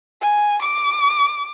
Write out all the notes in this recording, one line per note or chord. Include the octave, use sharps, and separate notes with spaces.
G#5
D6